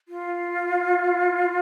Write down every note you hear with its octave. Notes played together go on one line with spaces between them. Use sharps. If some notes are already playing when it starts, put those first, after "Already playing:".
F4